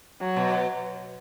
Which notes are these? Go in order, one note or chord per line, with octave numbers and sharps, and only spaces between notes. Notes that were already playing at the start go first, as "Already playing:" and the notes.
F#3
B2